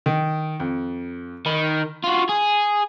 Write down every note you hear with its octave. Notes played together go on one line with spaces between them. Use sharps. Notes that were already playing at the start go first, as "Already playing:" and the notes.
D#3
F2
D#3 B5
F4 F#4
G#4